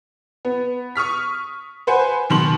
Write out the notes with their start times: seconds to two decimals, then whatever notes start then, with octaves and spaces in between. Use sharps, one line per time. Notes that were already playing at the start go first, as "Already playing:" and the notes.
0.45 B3
0.96 C#6 D#6 F6 B6
1.87 B4 C5 F#5 G#5
2.30 B2 D#3 C6 F#7